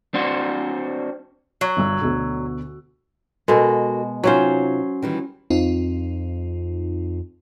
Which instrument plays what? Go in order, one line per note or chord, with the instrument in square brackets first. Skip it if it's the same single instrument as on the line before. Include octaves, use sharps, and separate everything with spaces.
[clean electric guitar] C4 D4 F#4 C5
[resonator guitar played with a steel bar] F#3
[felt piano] G1 G2 E6
D2 B2 D3
[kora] B2 G#3 [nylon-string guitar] F#4 A4 A#4
[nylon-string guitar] C3 D#4 F4 [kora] F#3 C#4 C5
[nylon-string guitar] D#3 E3 G3
[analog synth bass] F2 [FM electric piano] C4 D#4 F4